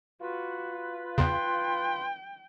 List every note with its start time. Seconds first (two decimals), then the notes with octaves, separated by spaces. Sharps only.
0.21 F4 F#4 B4
1.18 E2 C#3 G5 C6